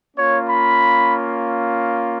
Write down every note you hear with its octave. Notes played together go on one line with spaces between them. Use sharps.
A#3 C#4 F4 C#5
B5